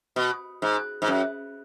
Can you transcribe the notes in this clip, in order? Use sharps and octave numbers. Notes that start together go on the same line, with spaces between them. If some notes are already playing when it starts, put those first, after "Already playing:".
B2
G#2
G#2
F#2